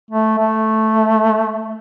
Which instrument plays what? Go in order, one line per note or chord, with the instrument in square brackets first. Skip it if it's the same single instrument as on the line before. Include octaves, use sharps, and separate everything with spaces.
[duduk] A3
A3